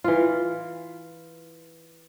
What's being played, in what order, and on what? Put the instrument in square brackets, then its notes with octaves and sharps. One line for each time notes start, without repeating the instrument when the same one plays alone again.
[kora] E3 F4